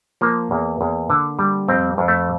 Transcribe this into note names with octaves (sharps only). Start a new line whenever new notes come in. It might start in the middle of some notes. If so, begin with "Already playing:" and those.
F3 A#3
E2
E2
D3
G3
F2 C4
F2
A3